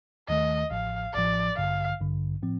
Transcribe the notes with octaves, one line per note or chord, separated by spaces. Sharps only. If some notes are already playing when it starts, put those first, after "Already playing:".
D#2 D#3 A3 D#5
A1 A2 F3 F5
A1 A2 F3 D5
A1 G2 D3 F5
A1 G2 D3
A2 F3 C4